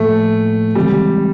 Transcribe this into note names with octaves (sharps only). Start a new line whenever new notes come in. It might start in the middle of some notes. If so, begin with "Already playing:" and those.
Already playing: A2 F3 A3 A#3
C#3 E3 G3 G#3 C4